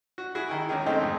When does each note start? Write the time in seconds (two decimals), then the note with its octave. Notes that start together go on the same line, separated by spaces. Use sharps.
0.18 F#4
0.35 E4 F#4 G#4
0.49 D#3 E4
0.69 C#2 D#3 G#4
0.86 D#3 G#3 A3 C4 D#4
1.01 F2 G#2